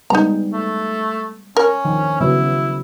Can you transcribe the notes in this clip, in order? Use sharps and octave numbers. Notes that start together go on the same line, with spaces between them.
G3 G#3 B3 D#4 A#5
A3
C#4 A#4
D#3 F3 D4
C#3 F#3 B3 E4